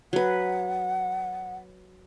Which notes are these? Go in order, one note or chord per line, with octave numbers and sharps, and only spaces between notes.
F#3 B4 F#5